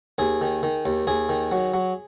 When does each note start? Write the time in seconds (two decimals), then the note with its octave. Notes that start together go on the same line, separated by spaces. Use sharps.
0.18 D#2 G#4
0.41 D#3
0.63 D#3
0.86 D#2
1.07 D#2 G#4
1.29 D#3
1.52 F#3
1.74 F#3